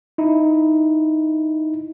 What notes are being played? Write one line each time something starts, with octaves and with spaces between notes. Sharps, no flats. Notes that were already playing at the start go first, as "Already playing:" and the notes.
D#4 E4